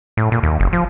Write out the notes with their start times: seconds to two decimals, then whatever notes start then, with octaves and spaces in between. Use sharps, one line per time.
0.17 A2
0.32 A#2
0.43 D#2
0.60 F#1
0.73 F3